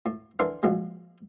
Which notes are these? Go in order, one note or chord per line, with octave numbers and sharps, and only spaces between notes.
A2
D3 E3 D4 A4 A#4 C6
A#1 A2 F#3 G#3